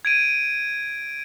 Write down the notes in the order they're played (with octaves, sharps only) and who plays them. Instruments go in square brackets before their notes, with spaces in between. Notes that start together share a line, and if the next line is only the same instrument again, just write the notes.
[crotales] G#6 D7 D#7